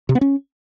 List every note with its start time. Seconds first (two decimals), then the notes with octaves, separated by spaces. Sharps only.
0.09 C3
0.15 B3
0.21 C#4